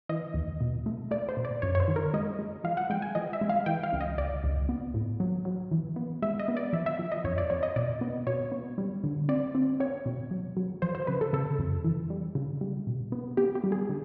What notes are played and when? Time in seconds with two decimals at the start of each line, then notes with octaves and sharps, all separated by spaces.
0.09 E3 D#5
0.34 D#2
0.61 B2
0.86 A3
1.11 A3 D5
1.29 C5
1.37 B2
1.45 D5
1.62 F#2 C#5
1.75 C#5
1.80 C5
1.88 D#3
1.96 A#4
2.14 G#3 D#5
2.39 G#3
2.64 F3 F5
2.77 F#5
2.90 G#3 G5
3.02 G#5
3.15 F3 D#5
3.33 E5
3.41 G#3
3.49 F5
3.66 E3 G5
3.83 F5
3.93 C#2
4.01 D#5
4.18 C#2 D5
4.44 C#2
4.69 B3
4.94 A2
5.20 F#3
5.45 F#3
5.71 E3
5.96 B3
6.22 G#3 E5
6.39 D#5
6.48 B3
6.57 D5
6.73 F3 E5
6.86 E5
6.99 F3
7.12 D#5
7.24 F2 C#5
7.38 D5
7.50 F2 C#5
7.63 D#5
7.76 B2 D5
8.01 B3
8.27 B2 C#5
8.52 B3
8.78 G3
9.04 D3
9.29 C4 D5
9.55 C4
9.80 C4 C#5
10.06 B2
10.31 F#3
10.57 F#3
10.82 F3 C5
10.95 C5
11.07 C#3 B4
11.21 A4
11.33 C#3 A4
11.59 F2
11.84 E3
12.10 G3
12.35 C#3
12.61 G3
12.87 B2
13.12 B3
13.37 B3 G4
13.55 G4
13.64 G3
13.72 G#4
13.89 D3